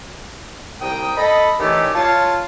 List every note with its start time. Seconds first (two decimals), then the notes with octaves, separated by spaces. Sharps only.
0.81 C2 A#4 G5 D#6
1.17 A4 D#5 B5
1.60 D#3 E3 A3 C#4 G4 D5
1.95 F4 C#5 A5